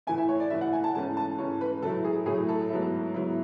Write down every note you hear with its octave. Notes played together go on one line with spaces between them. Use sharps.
A2 E3 A3 E4 G#5
E5
C#5
D5
A2 E3 A3 E4 E5
F#5
G#5
A5
G#2 E3 A3 C#4 A5
A5
G#2 E3 A3 C#4 C#5
B4
A2 F#3 A3 E4 A4
G#4
A2 F#3 A3 E4 G#4
A4
G#2 F#3 B3 E4
G#2 F#3 B3 E4